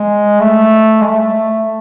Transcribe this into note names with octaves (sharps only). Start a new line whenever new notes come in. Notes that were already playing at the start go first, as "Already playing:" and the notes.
Already playing: G#3
A3
G#3
A3